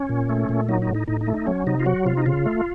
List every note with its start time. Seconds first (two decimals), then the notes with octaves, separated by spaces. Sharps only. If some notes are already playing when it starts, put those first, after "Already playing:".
Already playing: C#4
0.09 A#2
0.29 A3
0.49 A#2
0.69 F#3 D#4
0.82 D#4
0.88 A2
0.95 D#4
1.08 A2 D#4
1.21 D#4
1.27 A3
1.34 D#4
1.47 F#3 C#4
1.67 C3 D#4
1.80 F4
1.86 F#3 F#4
2.06 C3 F4
2.17 D#4
2.26 C#3 F4
2.46 A3